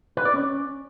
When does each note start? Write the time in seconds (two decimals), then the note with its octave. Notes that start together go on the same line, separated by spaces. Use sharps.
0.17 B4
0.25 D5
0.34 C#4